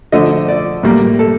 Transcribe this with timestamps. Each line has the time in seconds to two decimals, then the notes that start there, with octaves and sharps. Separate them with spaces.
0.12 D3 F3 A3 D#5
0.48 D5
0.83 A2 G3 A#3
1.19 A4